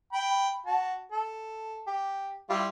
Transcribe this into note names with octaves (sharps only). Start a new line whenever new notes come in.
G5 B5
F#4 A5
A4
G4
G3 E4 F4